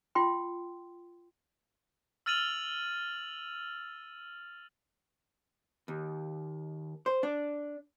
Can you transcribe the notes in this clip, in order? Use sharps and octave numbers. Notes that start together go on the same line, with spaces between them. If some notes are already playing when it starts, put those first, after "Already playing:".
F4 G5 C6
E6 F6 A6 D#7 F7 F#7
D#2
C5
D4